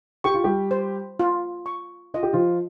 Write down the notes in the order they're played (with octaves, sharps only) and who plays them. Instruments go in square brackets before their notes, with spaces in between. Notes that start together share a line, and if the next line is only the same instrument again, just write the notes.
[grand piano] G4 [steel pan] C#6
[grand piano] F4
G3 G4
[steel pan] C5
F4
C#6
[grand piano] F4 [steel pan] D#5
[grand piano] G4
F3 F4